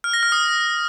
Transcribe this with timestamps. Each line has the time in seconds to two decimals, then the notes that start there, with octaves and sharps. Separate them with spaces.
0.04 F6
0.13 A#6
0.23 F6
0.32 D#6